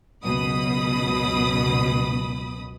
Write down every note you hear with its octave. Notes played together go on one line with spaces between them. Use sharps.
C#2 F#2 B2 B5 D#6